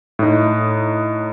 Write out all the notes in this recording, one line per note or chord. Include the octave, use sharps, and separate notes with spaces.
A2 D#4